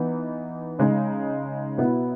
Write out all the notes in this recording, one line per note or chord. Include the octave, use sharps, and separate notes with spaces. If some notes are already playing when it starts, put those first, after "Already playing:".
Already playing: E3 B3 D#4
C#3 G#3 D#4
B2 F#3 B3 E4